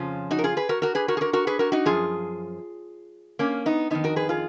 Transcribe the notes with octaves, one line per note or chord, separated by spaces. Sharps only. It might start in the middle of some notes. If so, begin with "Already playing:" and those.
Already playing: F2 C#3 F3 C#4 F4
D#4 F#4
A#4
F4 G#4
G#4 B4
F#4 A#4
F#4 A#4
G#4 B4
F#4 A#4
G#4
F#4 A#4
F#4 A#4
G#4 B4
F#4 A#4
D#4 F#4
F#2 F3 F4 G#4
A#3 C#4
B3 D#4
F2 D#3 B3 D#4
F#4 A#4
G#4 B4
F4 G#4